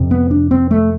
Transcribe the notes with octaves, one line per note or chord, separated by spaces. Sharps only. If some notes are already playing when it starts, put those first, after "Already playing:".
Already playing: F2 C3
B3
D4
C4
A3